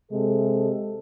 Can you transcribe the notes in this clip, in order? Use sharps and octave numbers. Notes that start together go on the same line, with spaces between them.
C3 G#3 A4